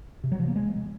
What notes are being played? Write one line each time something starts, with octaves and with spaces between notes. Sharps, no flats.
C3
F#3
F3
A#3
G#3